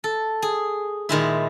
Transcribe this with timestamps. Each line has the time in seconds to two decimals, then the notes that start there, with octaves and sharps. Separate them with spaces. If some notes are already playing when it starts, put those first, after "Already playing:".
0.04 A4
0.42 G#4
1.09 A#2 D#3 G#3 E4